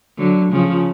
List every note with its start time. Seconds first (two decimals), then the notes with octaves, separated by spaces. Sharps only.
0.18 D3 F#3
0.52 C#3 F3